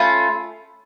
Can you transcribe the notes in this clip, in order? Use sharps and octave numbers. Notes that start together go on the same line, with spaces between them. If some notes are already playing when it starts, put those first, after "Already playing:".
Already playing: A3 C#4 F4 B5